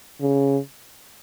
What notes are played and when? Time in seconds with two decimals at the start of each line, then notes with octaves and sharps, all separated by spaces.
0.21 C#3